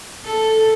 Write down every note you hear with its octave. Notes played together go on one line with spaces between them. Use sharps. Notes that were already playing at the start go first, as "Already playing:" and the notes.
A4